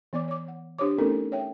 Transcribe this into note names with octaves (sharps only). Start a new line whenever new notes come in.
E3 B3 D5 D6
C#5 D6
F#5
D4 G4 C5 C#5 D6
A3 B3 C#4 D#4 A4 A#4
C#5 E5 G5